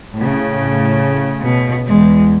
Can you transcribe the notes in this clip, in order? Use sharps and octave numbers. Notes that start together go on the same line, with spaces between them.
A2 C#3
B2
E2 G#3